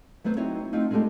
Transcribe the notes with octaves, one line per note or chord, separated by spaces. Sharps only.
F#3 A3 B3 C5
C4 D#4 E4 F#4 C#5
A3 C4 D#4 F4
G#3 A3 D4 D#4 G4 A4